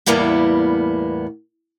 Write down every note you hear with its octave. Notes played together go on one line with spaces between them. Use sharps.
E2 A2 G3 A#3 B3